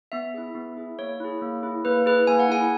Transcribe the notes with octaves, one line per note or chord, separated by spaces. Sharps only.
B3 E5
E4 G#4
B3
E4 G#4
A#3 C#5
E4 G#4
A#3
E4 G#4
A#3 B4
E4 G#4 B4
A#3 G#5
F#5
E4 G#4 G#5